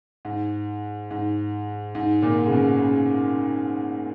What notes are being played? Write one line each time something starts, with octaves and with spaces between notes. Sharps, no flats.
G#2
G#2
G#2
A#2
C#3
B2
C#3